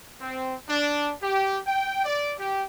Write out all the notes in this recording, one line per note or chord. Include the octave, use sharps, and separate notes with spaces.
C4
D4
G4
G5
D5
G4